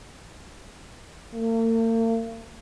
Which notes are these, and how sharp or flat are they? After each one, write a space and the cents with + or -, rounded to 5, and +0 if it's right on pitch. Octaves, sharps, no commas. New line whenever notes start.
A#3 -45